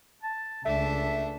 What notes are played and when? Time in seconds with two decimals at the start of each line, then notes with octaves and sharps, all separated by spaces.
0.23 A5
0.65 C#2 A3 D4 E5